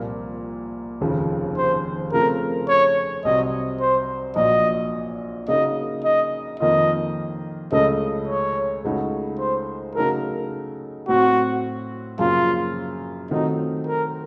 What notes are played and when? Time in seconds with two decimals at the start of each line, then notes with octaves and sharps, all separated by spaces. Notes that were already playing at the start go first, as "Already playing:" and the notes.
Already playing: C2 A#2 F3 A#3
1.01 F1 D#2 C#3 F3
1.57 C5
2.13 C#3 F3 A3 C4 A#4
2.68 C#5
3.25 C2 C3 F#3 C4 D#5
3.80 C5
4.36 A#1 A#2 F#3 D#5
5.48 C#3 F#3 A#3 D#4 A#4 D#5
6.04 D#5
6.60 F2 D#3 A#3 F4 D#5
7.72 C#2 C#3 A3 C#4 A4 D#5
8.28 C#5
8.84 C#2 C#3 A3 D#4 F#4
9.39 C5
9.95 C#3 F#3 A3 D#4 A4 A#4
11.08 A2 F#3 C4 F#4
12.19 F#2 C#3 F3 A#3 F4
13.31 D#3 F#3 A3 C4 D#4 F4
13.87 A#4